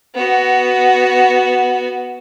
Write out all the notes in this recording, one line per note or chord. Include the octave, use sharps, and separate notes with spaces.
B3 F#4